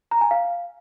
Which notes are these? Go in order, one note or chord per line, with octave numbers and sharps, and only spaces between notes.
A#5
G#5
F5